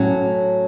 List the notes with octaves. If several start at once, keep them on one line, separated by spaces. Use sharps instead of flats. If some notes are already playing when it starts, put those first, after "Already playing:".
Already playing: A2 F#3 C#4